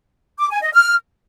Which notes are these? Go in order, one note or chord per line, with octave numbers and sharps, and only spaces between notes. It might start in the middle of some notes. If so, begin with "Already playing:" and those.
D6
G#5
D#5
F6